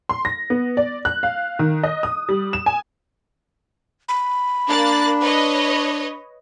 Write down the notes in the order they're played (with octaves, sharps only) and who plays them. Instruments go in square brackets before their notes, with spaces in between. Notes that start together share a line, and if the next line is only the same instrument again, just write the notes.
[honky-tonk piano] C6
A#6
B3
D5
F#6
F5
D#3
D#5
D#6
G3
E7
G#5
[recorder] B5
[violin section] A#3 F#6 A6 [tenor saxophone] D4
[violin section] B4 C#5 D#5